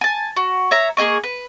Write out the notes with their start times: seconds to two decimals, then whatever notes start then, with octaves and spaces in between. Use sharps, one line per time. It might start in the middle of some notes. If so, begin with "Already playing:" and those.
0.01 G#5 A5
0.36 F#4
0.71 C#5 E5 A#5
0.97 A#3 G#4 D#5 C#6
1.24 B4